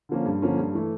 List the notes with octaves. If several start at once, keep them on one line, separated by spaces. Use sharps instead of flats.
D3 F3 A#3 C#4
G2
D3 F3 A#3 C#4
G2
E3 A3